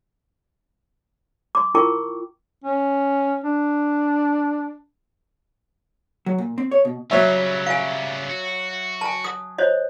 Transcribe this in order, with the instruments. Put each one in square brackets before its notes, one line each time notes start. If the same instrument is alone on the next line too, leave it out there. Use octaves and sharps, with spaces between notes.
[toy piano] C6 D6
E4 F4 A#4 G5 C#6 D6
[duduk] C#4
D4
[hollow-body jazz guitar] F#3
A#2
C4
C#5
B2
[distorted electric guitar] C#3 G3 [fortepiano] F#3 C#5 E5
[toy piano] F5 G#5
[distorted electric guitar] F#4
[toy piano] G#5 A5
D#6
C5 C#5 D#5